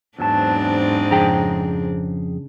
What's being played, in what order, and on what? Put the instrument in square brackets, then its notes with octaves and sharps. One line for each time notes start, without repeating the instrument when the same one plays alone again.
[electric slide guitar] E2 F#3 A5 [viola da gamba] G#2 C4 D4
[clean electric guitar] F2 G#4 G5 [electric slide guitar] C#3 A#5